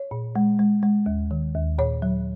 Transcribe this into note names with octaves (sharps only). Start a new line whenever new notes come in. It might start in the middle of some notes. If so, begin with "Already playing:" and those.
Already playing: C#5
A#2
G#3
G#3
G#3
D#2
D#3
D#2
A#2 C#5
F#3